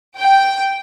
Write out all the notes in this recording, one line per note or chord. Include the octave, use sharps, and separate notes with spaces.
G5